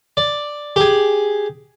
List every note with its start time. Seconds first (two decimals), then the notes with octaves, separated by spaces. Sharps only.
0.17 D5
0.76 G4 G#4